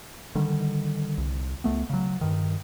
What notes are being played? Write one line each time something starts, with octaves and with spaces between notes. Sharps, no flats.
D3 D#3 G3
C2
C#2 A3 B3
C#3 F#3
G2 D#3